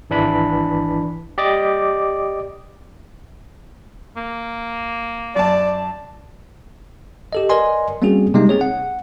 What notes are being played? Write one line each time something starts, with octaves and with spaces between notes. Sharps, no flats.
G#1 E3 D4 B5
G4 D5 D#5 D6
A#3
F#2 D5 A5
G4 A4 D#5
A#4 B4 D5 D#5 G#5 C6
G3 A#3 C4 C#4 F#4 G#4
C3 G3 G#3 A#3 D#4
C4 G#4 C#5
F#5